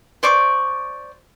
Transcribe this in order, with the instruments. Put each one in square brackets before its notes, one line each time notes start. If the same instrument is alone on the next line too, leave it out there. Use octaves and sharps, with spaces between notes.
[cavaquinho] C5 D5 C#6 D6